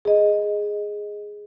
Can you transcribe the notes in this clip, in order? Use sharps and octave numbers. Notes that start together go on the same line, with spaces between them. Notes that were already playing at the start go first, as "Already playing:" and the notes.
G#4 D#5